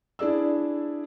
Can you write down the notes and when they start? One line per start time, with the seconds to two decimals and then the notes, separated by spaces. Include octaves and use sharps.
0.19 D4 E4 G#4 D5 E6